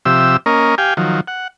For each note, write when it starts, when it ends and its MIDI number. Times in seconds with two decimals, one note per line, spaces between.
0.06 0.37 48
0.06 0.37 53
0.06 0.37 67
0.06 0.37 76
0.06 0.37 88
0.46 0.75 58
0.46 0.75 61
0.46 0.75 70
0.46 0.75 75
0.78 0.94 67
0.78 0.94 77
0.78 0.94 79
0.78 0.94 80
0.97 1.21 51
0.97 1.21 53
0.97 1.21 54
1.28 1.48 78